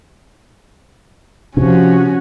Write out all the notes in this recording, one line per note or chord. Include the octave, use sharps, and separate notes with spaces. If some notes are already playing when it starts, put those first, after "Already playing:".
C3 F3 C#4 F#4